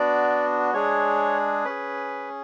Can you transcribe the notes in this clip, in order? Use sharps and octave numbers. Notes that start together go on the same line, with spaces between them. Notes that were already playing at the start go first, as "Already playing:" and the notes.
Already playing: B3 D4 F#4 D5
G#3 D4 G#4 C#5
C#4 G#4 B4